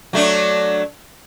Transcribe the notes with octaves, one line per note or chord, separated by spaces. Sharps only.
F#3 A3 D4